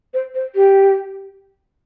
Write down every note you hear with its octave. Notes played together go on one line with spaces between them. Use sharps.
C5
C5
G4